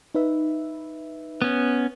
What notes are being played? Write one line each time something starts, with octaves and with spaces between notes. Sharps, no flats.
D#4 B4 E5
B3 C#4